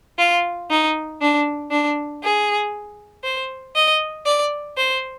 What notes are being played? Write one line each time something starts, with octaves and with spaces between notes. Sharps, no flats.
F4
D#4
D4
D4
G#4
C5
D#5
D5
C5